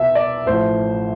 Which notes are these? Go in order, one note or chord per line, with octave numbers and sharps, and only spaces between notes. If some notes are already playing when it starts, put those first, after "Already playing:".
Already playing: C2 B2 E5
D5
A1 A2 F3 C5